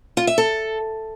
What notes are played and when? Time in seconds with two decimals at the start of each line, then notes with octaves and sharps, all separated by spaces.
0.17 F4
0.27 E5
0.38 A4